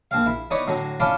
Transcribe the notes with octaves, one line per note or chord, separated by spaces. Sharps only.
A#1 C4 F5
E4
B3 D#4 E4 C#5 D5
A2 D3 F#3
C#4 D4 E4 F4 D5 A5